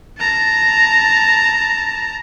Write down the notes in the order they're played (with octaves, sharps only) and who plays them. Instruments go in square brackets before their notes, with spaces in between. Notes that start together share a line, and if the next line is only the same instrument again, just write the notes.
[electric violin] A5 A#5